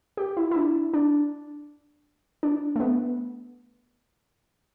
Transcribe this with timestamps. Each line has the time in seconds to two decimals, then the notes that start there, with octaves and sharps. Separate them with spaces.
0.17 G4
0.37 E4
0.51 E4
0.56 D4
0.94 D4
2.43 D4
2.76 A3
2.80 B3